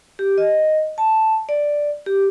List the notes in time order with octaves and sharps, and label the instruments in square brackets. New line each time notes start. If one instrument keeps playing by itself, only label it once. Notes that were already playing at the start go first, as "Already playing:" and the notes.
[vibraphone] G4
D#5
A5
D5
G4